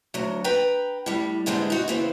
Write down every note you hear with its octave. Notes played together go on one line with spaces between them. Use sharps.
D2 F#3
B4 G5 A#5
A2 G3
G#2 D3 E3 G3 G#3
D#4 F#4
C#3 E3 C4